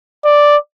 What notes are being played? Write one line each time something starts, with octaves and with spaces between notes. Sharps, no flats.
D5